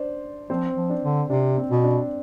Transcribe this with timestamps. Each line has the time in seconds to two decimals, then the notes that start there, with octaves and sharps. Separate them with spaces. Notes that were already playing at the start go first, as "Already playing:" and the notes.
Already playing: D4 C5 D5
0.50 F3 C4 C5
0.76 F3
0.90 D4
1.04 D3
1.30 C3 D4
1.57 C4
1.71 B2
1.84 D4